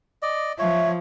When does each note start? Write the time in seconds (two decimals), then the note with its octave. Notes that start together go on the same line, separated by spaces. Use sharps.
0.22 D5 D#5
0.59 F3 C#5 E5